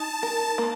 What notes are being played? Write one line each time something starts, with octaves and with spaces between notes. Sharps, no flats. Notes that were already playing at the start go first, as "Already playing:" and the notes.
Already playing: D#4 A5
A#4
A#3